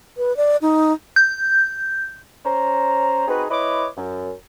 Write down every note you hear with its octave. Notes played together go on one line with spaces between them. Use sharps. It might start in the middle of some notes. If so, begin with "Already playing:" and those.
B4
D5
D#4
G6
C#4 C5 A#5
C4 D#4 F#4 G#4 B4
E4 B4 C#5 D#5 B5 D6
F#2